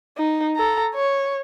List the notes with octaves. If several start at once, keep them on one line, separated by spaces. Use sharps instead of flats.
D#4
A4 A#5
C#5